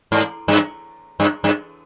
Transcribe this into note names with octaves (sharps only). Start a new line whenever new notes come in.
G#2
G2
G2
G2